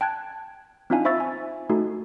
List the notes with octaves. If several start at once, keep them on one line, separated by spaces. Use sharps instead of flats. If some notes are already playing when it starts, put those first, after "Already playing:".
G5 A5 F#6 G#6
C4 D4 D#4 F4 F5 G#5
C5 E5 B5 C#6 E6 A6
G#5
A3 D#4 F#4 A4